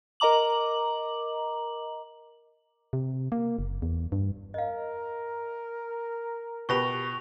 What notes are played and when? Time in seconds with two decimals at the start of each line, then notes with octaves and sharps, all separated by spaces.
0.20 A#4 D#5 A#5 D6 F#7
2.93 C3
3.32 A#3
3.59 F#1
3.82 E2
4.12 G2
4.54 A#4 D#5 F5
6.69 B2 F4 G4 B4 G5 C#6 A#6 F7